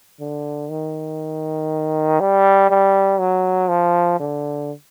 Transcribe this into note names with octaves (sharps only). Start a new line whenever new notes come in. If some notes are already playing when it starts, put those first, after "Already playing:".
D3
D#3
G3
G3
F#3
F3
D3